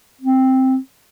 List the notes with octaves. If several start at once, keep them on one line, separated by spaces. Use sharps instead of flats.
C4